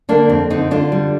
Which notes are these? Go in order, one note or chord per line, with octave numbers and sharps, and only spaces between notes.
D3 A#3 D4
F2 C4
D3 C4 D#4
D3 D4 F4
G3